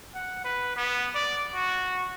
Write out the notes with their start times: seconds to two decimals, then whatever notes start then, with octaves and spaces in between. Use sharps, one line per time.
0.14 F#5
0.45 B4
0.76 B3
1.15 D5
1.54 F#4